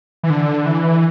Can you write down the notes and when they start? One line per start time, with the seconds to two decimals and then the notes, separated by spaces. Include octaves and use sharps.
0.23 E3
0.30 D3
0.66 E3